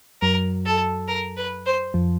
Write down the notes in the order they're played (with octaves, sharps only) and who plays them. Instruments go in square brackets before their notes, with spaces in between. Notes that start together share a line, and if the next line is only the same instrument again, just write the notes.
[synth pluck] F#2 F#3 [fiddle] A#4
[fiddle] A4
A#4
B4
C5
[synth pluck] F2 F3